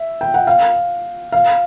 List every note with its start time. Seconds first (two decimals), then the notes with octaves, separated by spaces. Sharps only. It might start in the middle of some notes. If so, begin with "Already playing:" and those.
Already playing: E5
0.21 G5
0.34 F#5
0.47 F5
1.32 F5